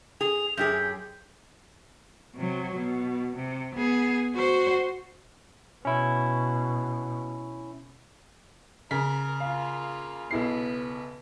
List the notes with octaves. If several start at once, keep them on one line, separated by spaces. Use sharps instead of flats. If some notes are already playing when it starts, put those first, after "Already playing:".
G#4 F7
F#2 G4 G#4 G6
C3 F#3
B2
C3
B3 G#4
F#4 C5
B2 C#4 E4
C#3 A#4 B6
A#3 F4 F5
B1 B3 E4 C7